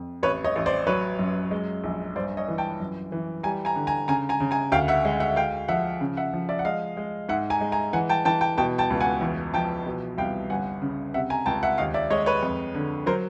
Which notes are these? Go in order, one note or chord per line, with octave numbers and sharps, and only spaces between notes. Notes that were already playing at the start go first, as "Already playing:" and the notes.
Already playing: F2
A1 B4 C#5
C#5 D#5
A1
C5 D5
F#3 B4 C#5
F#2
G#3
A#1
G2 C5 D5
C#5 D#5
E3
G5 A5
F#2
E3
G3 G#5 A#5
G#5 A#5
D3
G#5 A#5
C#3 G#5 A#5
G#5 A#5
C#3
G#5 A#5
D2 F5 G5
E5 F#5
G#3
E5 F#5
G#3 F5 G5
F3 E5 F#5
C#3
E5 F#5
F3
D5 E5
F#5
G#3 D#5 F5
G#3
G#2 E5 F#5
G#5 A#5
G#3
G#5 A#5
E3 F#5 G#5
G5 A5
E3 G5 A5
G5 A5
B2 G5 A5
G5 A5
C#2
F#5 G#5
E2
F3 G5 A5
B2
C2 F5 G5
G1 F#5 G#5
C#3
C3 E5 F#5
G#5 A#5
C#2 G5 A5
E5 F#5
D#2 D#5 F5
D5 E5
G#3 C#5 D#5
B4 C#5
F2
D3
F#3 A#4 C5